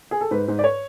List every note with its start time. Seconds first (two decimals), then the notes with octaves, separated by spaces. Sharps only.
0.11 G#4
0.21 A4
0.31 G#2 B4
0.48 G#2
0.59 D5
0.64 C#5